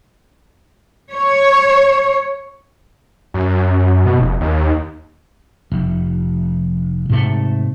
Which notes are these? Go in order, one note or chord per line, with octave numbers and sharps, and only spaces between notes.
C#5
F#2
B2
F1
D#2
F1
G#2 C3 A3